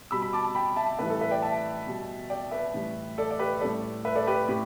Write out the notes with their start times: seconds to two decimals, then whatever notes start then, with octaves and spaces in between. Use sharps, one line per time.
0.11 B2 G3 B5 E6
0.22 B5
0.33 A5 D6
0.55 G5 B5
0.76 E5 A5
0.99 A2 E3 G3 B4 E5
1.10 A4
1.21 B4 E5
1.31 D5 G5
1.42 E5 A5
1.87 B2 G3
2.30 D5 G5
2.51 B4 E5
2.74 A2 E3 G3
3.18 A4 D5
3.31 D5
3.39 G4 B4
3.61 A2 G3 A4 D5
4.05 B4 E5
4.15 A4 D5
4.27 G4 B4
4.49 A2 G4